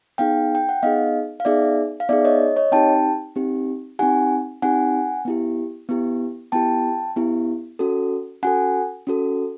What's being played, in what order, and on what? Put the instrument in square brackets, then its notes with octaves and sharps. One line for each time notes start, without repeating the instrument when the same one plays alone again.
[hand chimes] B3 D#4 G#4 F5 G5
G5
F#5
B3 D#4 G#4 D#5 F5
F5
B3 D#4 G#4 D5 E5
F5
B3 D#4 G#4 D5 E5
C#5 D#5
C#5 D#5
C4 D#4 G4 G5 A5
C4 D#4 G4
C4 D#4 G4 F#5 G#5
C4 D#4 G4 F#5 G#5
B3 E4 G4
B3 E4 G4
B3 E4 G4 G5 A5
B3 E4 G4
C#4 F#4 A4
C#4 F#4 A4 F#5 G#5
C#4 F#4 A4